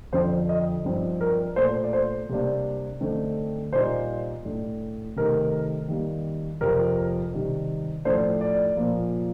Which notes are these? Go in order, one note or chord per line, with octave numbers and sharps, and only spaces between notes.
F2 D3 F3 C4 C5
D#5
G2 F3 C4 D#4
A#4
A#2 A3 D4 C5
D5
C5
C3 G3 A#3 D4
D3 A3 C4 D#4
A#2 G3 A#3 D#4 C5
A2 A3 D4
C3 D#3 A3 D#4 A#4
D#3 G3 A#3
F2 C3 F3 A#4
C3 D#3 G3
A2 F3 A3 D4 C5
D5
A#2 F3 A#3